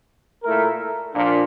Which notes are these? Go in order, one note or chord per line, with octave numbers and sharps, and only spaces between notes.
A#2 A3 E4 A#4
A#2 F3 A#3 D4